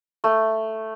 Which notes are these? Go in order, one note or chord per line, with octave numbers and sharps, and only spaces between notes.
A3